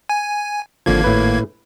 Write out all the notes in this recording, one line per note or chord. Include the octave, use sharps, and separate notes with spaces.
G#5
G#1 D3 F3 A#3 G#6
A2 B4